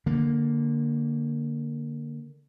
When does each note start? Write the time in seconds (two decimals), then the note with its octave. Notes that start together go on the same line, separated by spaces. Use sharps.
0.06 D3 A#3